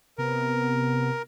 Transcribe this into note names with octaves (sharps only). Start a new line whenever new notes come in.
C3 B3 A#4